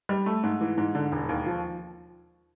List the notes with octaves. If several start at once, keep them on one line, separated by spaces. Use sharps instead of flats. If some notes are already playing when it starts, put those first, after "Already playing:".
G3
A3
G#2
E3
G#2
D3
E1
D#2
F3